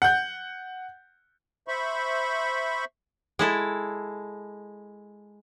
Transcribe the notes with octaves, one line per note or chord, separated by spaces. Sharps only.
F#5 G6
C5 E5 B5 C#6
G#3 E4 A4